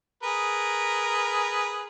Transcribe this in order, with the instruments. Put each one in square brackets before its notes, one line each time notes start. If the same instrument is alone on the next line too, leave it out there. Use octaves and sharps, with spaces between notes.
[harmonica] G#4 A#4 B4